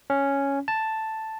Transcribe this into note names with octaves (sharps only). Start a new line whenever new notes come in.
C#4
A5